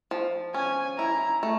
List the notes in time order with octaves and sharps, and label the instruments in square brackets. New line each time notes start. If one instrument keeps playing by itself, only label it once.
[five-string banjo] F3
[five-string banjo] C#4 [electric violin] G#5
[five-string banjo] E4 [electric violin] A#5
[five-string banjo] A3